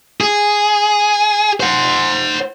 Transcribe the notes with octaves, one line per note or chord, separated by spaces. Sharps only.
G#4
C5 F#5